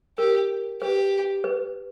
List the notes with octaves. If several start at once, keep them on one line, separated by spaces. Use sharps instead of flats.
G4 A#4
G4 B4
B4